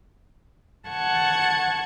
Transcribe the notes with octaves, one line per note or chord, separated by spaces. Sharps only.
F#5 A5 C#6 G#6